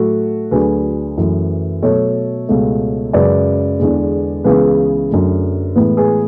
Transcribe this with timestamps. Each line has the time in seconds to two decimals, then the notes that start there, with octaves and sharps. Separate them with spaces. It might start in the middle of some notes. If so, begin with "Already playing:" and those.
Already playing: A2 F#3 A3 F#4 A4
0.51 D2 D3 F#3 G#4 B4
1.18 F#2 E3 A3
1.82 B2 F#3 A3 A4 C#5
2.49 C#2 B2 A3
3.13 F#2 C#3 G#3 B4 D5
3.80 E2 D3 G#3
4.44 C#2 C#3 E3 B3 G#4 B4
5.10 F#2 D3 A3
5.75 A2 E3 G#3 B3
5.97 G#4 B4